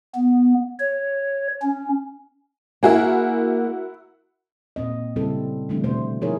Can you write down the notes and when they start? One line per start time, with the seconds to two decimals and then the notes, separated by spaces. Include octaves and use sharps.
0.15 B3
0.79 C#5
1.62 C#4
2.83 A#3 E4 F#4 G#4 A#4 G#5
4.76 A#2 C4 D#5
5.16 C#3 G3 C4 E4 A4
5.69 D3 E3 G3 A3 C4 D4
5.84 B2 A3 C5
6.21 F3 D#4 E4 G#4 A#4 C#5